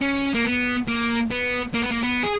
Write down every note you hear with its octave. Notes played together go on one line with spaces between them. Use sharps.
C#4
A#3
B3
A#3
B3
A#3
B3
A#3
B3
G#4